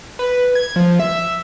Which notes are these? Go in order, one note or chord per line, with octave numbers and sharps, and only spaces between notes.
B4
G#6
F3
E5